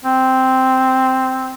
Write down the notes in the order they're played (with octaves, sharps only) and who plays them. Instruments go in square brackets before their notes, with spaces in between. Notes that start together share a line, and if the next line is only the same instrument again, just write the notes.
[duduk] C4